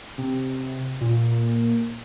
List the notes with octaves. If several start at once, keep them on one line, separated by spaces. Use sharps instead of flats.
C3
A#2